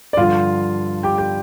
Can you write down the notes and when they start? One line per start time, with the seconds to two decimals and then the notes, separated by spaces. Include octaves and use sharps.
0.13 D5
0.17 G2 D3 F3 F4 F5
1.03 G4 G5
1.18 G4 G5